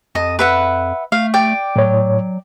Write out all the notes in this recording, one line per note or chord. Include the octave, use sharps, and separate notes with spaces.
F2 D#5 A5
B4 E5 F#5
A3 F5
D5 G5
A2 F#3 C#5